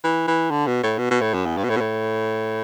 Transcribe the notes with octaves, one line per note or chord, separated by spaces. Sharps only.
E3
E3
D3
B2
A2
B2
B2
A2
F#2
E2
G2
B2
A2
B2
A2